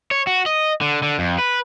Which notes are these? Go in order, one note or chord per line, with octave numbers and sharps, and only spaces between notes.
C#5
F#4
D#5
D3
D3
F2
B4